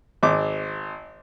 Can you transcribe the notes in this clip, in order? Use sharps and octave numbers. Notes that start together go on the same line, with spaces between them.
G#1 D6